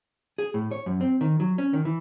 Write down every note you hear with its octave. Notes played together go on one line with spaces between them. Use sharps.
G#4
A2
C#5
F#2
C4
D#3
F#3
C#4
D#3
E3